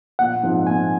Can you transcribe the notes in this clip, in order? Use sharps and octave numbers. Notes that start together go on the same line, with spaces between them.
A#1 F#5
G#2 F3 C4 D#4
A#1 G#5